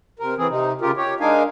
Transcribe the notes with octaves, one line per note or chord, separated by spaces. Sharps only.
C3 A#4
E3 C4 G#4
C3 D#4
C#3 F4 G4 A#4
G4 C#5
G#3 D4 D#4 A#4 F5 G#5